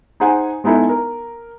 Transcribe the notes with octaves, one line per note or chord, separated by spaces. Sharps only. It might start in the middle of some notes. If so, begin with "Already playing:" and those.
D#4 G#4 C5 F#5 G#5
G#3 B3 D#4 E4 A4
A#4